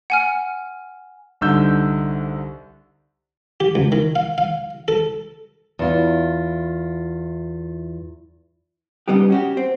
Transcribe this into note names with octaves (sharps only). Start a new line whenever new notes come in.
F#5 G#5 F6
C2 D3 D#4 E6 G6
G4
C#2
D#3
F5
F5
A4
E2 E4 F4
G2 C#3 G3 B3 D#4 G4
C#4 F#4 G4
C4